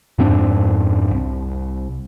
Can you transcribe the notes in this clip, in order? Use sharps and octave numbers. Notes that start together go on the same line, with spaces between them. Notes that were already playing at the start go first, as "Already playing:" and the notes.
F2 G#2 C4 D4
C2